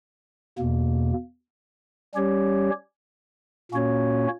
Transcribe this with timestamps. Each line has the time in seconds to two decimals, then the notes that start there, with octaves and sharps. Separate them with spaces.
0.58 E2 B2 A#3
2.15 G3 C#4 G4 C#5
3.72 A#2 A#3 C#4 F#4 C#5